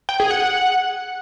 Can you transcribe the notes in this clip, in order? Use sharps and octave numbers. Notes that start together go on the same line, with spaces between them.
G5
G#4
F#5